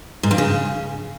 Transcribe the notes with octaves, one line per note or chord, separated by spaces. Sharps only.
G#2
F2
C#3